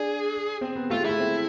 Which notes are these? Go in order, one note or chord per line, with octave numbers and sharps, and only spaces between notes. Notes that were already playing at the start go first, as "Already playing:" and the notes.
Already playing: D4 G#4
C4
B3
A3 F4
G#3
A3 E4
C4